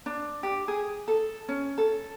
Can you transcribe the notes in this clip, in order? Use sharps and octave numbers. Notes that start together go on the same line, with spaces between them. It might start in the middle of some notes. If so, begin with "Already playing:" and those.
D4
G4
G#4
A4
C#4
A4